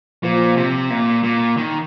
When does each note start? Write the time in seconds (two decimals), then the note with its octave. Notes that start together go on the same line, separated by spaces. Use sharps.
0.24 A#2 F3
0.57 C3
0.90 A#2
1.23 A#2
1.57 D#3